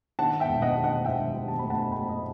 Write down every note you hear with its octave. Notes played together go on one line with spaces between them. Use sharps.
D#3 F#5 A5
E5 G5
E1
D#5 F#5
D#3
D#5 F#5
D#3 E5 G5
D#3
A5
A3 B5
F#5 A5
A3 G5 B5
D#5